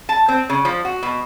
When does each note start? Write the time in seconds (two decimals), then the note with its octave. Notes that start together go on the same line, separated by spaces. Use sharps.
0.09 A5
0.28 C4
0.49 C#3
0.65 F3
0.85 F#4
1.03 B2